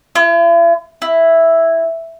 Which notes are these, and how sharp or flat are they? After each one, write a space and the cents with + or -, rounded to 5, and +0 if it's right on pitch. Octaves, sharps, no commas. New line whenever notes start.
E4 +45
E4 +0